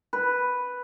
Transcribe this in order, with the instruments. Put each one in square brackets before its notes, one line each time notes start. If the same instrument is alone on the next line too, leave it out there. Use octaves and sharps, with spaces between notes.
[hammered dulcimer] B4